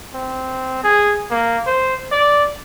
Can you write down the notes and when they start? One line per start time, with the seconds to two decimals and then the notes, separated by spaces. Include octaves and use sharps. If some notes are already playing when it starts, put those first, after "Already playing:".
0.15 C4
0.84 G#4
1.31 A#3
1.67 C5
2.12 D5